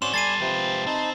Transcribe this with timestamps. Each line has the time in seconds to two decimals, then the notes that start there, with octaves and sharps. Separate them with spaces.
0.02 C4 C#4 F#4 C5 D5 C6 E7
0.14 G3 A4 D5 G#5 B5 A6 C7 D#7
0.41 C3 F3 G#3 B4 G5
0.86 C4 D#4 A5 B5